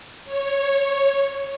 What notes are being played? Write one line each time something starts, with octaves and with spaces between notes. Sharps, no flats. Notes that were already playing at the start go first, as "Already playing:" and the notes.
C#5